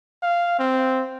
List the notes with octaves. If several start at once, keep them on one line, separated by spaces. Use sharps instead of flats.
F5
C4